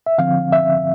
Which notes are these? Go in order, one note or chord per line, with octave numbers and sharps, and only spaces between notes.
E5
D3 F3 C4 F5
E5